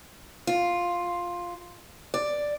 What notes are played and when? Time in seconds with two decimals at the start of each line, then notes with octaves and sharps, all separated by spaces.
0.47 F4
2.14 D5